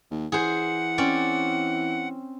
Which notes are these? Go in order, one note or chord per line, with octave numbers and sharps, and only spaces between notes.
D#2
E3 G#4 C5 F#5
C4 C#4 D5